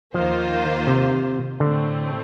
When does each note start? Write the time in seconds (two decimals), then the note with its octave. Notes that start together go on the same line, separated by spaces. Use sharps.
0.14 D#2 D#3 F3 A#3 F4 C5
0.87 C3
1.60 A2 D3 A3 C4